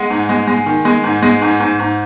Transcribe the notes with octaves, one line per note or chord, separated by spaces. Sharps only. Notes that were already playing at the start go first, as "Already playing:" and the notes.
Already playing: G#3 F#5 G#5
G#2
G#3
G#3
D#3
G#3
G#2
G#3
G#2
G#2
G#2